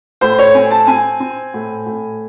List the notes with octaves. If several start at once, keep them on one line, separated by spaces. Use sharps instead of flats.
A2 C5
C#5
C4 G#5
A5
C4 G#5
C4
A2
A2